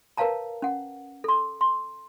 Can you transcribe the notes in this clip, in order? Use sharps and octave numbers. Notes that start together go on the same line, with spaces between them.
A#4 B4 C#5 F5 A5 A#5
C#4 F#5
A4 C6
C6